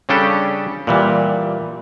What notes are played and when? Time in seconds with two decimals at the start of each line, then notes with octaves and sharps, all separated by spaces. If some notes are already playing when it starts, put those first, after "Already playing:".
0.09 C#3 G3 C#4 D4 G4 A4
0.87 A#2 E3 G3